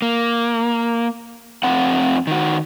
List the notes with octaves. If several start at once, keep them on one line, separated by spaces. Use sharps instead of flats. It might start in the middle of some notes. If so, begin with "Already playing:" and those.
A#3
F2 A3 C4 F#5
D#3 F#4